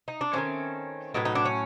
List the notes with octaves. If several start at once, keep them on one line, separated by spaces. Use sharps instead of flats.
D#4
D4
D#3 F#3 A3 C4 C#4
A2 F#3 B3 D#4
D#4
D4
C#4